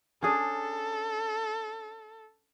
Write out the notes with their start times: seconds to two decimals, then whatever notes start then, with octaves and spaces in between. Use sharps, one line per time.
0.23 C#4 D4 G#4 A4